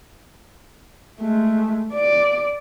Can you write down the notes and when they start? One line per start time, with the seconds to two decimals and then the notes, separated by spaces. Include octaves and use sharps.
1.21 G#3 A3
1.93 D5